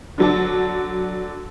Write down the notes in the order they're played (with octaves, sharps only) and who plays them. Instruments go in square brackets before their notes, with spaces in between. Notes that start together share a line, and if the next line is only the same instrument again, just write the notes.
[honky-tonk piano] D3 F#3 D4